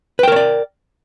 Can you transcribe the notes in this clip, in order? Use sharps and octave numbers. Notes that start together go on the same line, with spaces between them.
A#4 B4 C#5 D5 G5